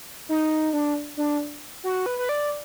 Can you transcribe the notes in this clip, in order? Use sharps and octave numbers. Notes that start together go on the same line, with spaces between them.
D#4
D4
D4
F#4
B4
B4
D5